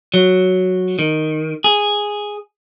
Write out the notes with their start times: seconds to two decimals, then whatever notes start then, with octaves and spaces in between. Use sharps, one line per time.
0.14 F#3
0.99 D#3
1.64 G#4